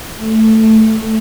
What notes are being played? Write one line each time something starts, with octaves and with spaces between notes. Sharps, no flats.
A3